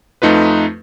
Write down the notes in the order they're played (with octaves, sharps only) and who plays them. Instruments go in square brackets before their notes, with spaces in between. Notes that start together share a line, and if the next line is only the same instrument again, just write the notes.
[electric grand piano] F2 A3 D#4 F4 B4